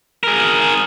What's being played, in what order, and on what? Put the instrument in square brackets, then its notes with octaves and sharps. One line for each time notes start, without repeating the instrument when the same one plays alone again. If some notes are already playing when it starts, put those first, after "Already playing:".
[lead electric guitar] G#4 A#4